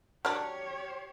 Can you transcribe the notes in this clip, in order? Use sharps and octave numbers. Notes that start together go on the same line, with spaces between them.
F#3 D4 G4 C#5 F6